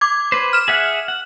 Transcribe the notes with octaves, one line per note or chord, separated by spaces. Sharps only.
D6 G#6
B4 C5
F6 E7
G#4 E5 F#5
F#5